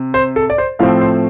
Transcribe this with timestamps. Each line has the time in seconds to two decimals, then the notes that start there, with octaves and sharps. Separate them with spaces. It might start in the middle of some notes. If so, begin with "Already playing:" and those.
Already playing: C3
0.14 C5
0.36 A4
0.50 D5
0.58 C5
0.79 A2 F3 A3 C4 F5
1.01 C5